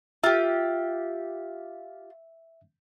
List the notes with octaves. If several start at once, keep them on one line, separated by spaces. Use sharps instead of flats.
F4 G4 E5